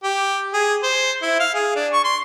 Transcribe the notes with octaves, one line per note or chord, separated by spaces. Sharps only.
G4
G#4
C5
E4
F5
G#4
D4
C#6
C6